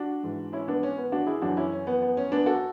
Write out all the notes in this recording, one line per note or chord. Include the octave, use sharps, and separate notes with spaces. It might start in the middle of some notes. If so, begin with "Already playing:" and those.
Already playing: D4 F#4
G#2 E3
C#4 E4
B3 D4
C#4
B3
D4 F#4
E4 G#4
F#2 E3 D4 F#4
C#4 E4
C#4
B3
B3
C#4
B3 D4
F#4 A4